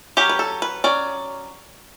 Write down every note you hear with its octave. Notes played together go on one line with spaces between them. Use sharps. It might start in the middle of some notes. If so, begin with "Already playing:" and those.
F#3 C#4 G4
B4
A4
B4
F#3 C#4 D5